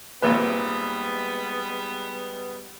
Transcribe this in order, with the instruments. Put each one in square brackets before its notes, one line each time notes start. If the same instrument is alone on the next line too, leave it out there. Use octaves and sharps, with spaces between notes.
[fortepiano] G#1 A#2 B4 [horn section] G3 G#3 B3